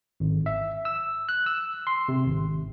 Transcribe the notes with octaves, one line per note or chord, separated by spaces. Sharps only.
G#1
E5
E6
F#6
E6
C6
C3
G#1